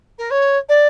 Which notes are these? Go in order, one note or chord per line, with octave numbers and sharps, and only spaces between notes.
A#4
C#5
D5